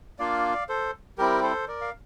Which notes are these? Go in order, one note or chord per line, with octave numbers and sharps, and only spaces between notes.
A#3 D4 F4 D5 F5
A4 C5
G3 C4 E4 G4 A#4
A4 C5
A#4 D5
F5